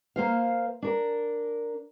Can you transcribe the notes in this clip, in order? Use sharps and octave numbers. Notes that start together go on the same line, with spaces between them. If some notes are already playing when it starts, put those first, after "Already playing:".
A#3 C5 F5
D4 A#4